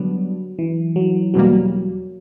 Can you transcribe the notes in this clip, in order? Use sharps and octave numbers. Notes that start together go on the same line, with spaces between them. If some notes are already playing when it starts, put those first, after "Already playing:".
Already playing: D3 F#3 G3 B3 D4
E3
F#3
E2 B2 F#3 G3 A#3